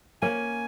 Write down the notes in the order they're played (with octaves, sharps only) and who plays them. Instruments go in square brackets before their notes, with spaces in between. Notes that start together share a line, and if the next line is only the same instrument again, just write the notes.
[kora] A#3 C#4 [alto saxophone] G#5